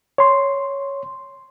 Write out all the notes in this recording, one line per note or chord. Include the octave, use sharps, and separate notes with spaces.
C#5 C6